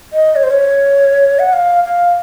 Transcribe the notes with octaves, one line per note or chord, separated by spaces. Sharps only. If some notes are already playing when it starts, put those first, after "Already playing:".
D#5
C#5
C5
C#5
F#5
F5
F5